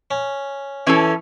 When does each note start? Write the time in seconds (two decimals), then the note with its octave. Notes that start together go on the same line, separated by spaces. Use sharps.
0.11 C#4
0.87 E3 C#4 E4 A4